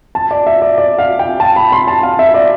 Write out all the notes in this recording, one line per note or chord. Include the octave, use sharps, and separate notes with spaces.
A5
D5
E5
D5
D5
F5
G5
A5
B5
C6
A5
F5
E5
D5